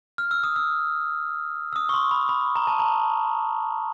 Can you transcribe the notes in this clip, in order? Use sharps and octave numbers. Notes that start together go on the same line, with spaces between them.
F6
E6
D#6
E6
E6
D#6
C#6
C6
B5
B5
A#5
A5
A#5